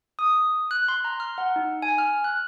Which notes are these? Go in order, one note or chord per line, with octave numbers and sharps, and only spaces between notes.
D#6
F#6
C6
A#5
F6
F#5
D#4
G#5
F6
F#6